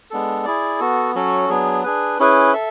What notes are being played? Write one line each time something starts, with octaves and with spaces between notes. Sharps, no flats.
G#3 B3 D4 A4
E4 G#4 D5
B3 F#4 A4
F#3 C#4 F#4 A4
F#3 B3 D4 G#4
D4 G#4 B4
C#4 E4 G#4 B4
A4 E5